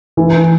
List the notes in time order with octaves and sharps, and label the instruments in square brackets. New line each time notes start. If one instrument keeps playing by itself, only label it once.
[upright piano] E3